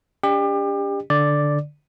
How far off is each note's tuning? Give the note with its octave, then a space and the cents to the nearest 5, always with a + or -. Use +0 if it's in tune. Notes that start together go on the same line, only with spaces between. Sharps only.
D4 -45 G4 +30 D5 +45
D3 +0 D5 +0